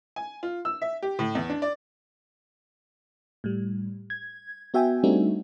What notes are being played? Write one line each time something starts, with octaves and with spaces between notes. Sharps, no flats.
G#5
F4
E6
E5
G4
A2
E2
D4
D5
A2 G3
G#6
B3 F#4 E5 G5 G#5
G3 A3 C4 D4 D#4 F#4